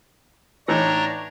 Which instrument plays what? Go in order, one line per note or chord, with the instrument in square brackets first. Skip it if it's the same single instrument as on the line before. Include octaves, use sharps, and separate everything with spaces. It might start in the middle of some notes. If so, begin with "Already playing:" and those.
[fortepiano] A2 E3 D#4 [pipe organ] D4 C#5 A#5